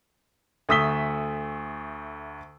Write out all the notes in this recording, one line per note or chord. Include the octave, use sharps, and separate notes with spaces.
D2 A3 D#6 E6 B6 G7